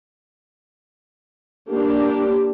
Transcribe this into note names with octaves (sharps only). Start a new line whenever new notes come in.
A#3 D4 G4